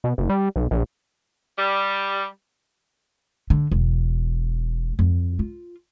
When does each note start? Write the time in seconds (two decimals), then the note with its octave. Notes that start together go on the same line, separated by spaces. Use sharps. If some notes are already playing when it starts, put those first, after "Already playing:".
0.04 B2
0.18 F#1
0.29 G3
0.56 B1
0.71 A#1
1.58 G3
3.50 D3
3.72 E1
4.99 F2
5.39 F4